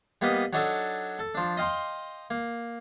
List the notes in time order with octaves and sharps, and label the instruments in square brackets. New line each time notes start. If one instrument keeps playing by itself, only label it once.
[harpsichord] G3 A#3 B3 B4 D#5
F#3 D4 D#4 F#4 A4 D5
A4
F3 D4
D#5 F5 G5 C6
A#3